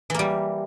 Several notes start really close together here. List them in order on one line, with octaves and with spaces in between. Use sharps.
E3 A#3 G3